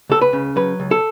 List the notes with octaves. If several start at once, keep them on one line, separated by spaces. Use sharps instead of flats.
C#2 A4
B4
C#3
F#3 B4
C#2
A4